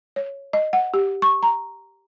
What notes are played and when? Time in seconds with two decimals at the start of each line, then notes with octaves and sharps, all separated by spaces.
0.16 C#5
0.53 D#5
0.73 F#5
0.94 G4
1.22 C#6
1.43 A#5